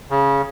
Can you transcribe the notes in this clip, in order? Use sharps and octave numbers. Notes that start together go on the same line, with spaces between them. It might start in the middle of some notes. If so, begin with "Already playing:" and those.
C#3